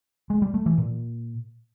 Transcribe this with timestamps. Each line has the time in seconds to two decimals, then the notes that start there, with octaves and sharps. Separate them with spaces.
0.30 G#3
0.42 G3
0.54 A3
0.66 E3
0.78 A#2